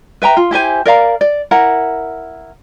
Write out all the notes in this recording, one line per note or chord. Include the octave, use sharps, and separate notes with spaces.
B4 E5 G5 A#5
F4
E4 G4 C5 G#5
A#4 D5 F5 A#5
D5
E4 A#4 F#5 A#5